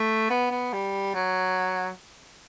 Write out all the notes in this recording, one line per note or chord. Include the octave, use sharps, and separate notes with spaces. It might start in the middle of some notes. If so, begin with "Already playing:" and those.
Already playing: A3
B3
B3
G3
F#3